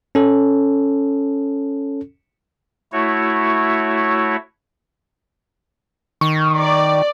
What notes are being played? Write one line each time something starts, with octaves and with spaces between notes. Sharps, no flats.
C#4 A4
A3 E4 F#4 C#5
D#3 C#6
D5